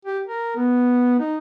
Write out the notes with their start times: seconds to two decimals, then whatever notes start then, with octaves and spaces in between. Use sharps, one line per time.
0.05 G4
0.26 A#4
0.56 B3
1.19 D#4